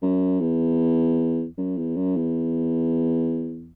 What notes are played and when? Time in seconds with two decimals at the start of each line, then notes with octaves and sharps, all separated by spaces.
0.02 F#2
0.40 E2
1.58 F#2
1.77 E2
1.96 F#2
2.16 E2